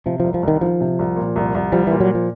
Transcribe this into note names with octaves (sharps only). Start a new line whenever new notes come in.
C3 F3
C2 F3
F3
C2 D#3
D#3 F3
C3
C2
A#2
C2
C2
F3 G3
A#2 E3
F#3
F3